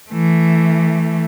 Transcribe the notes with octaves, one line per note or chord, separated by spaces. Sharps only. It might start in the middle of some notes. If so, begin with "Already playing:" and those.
E3 A3